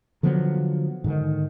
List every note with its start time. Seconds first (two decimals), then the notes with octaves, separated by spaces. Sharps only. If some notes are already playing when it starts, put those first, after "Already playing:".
0.23 D3 F3 F#3 B3
1.04 G#2 D3 D#3